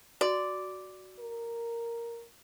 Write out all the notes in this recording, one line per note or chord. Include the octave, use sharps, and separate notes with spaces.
F#4 D5
A#4